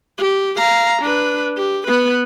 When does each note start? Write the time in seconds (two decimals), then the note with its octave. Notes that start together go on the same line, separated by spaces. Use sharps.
0.18 G4
0.57 F5 A#5
1.02 D4 B4
1.57 G4
1.87 B3 B4